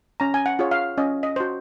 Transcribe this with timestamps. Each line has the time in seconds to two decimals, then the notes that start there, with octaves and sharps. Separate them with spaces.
0.20 C#4 A#5
0.34 G#5
0.46 F#5
0.59 F4 G#4 C#5
0.71 F5
0.98 C#4 D#5
1.23 D#5
1.36 F#4 C5